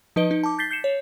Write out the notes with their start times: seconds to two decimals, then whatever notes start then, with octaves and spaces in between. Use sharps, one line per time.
0.16 F3 D#4 B4 D#5 D7 G7
0.31 D#4
0.43 A5 D6
0.59 G6 A6 B6 C7 G7
0.71 G6 C7 C#7 E7
0.84 C#5